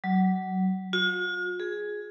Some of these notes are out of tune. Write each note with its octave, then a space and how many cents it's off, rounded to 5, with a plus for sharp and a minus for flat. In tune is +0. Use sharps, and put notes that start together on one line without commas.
F#3 +20
F4 +45
G#4 +5